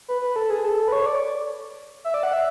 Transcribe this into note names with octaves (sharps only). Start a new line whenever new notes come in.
B4
B4
A4
G#4
A4
B4
C#5
D5
E5
D5
F#5
E5